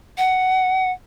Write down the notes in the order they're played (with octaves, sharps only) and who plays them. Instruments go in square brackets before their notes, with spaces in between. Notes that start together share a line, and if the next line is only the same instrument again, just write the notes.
[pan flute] F#5